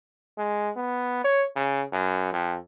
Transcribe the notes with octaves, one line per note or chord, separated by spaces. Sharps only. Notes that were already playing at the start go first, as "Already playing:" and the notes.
G#3
B3
C#5
C#3
F#2
F2